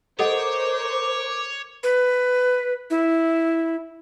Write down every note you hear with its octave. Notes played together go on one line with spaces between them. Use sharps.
A4 A#4 C5 C#5 D#5 F#5 D6
B4
E4